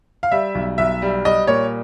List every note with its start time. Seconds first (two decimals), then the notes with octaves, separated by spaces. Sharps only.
0.23 F5
0.31 G3 E5
0.55 B1
0.78 B1 E5
1.02 G3
1.25 G3 D#5
1.47 A#2 C#5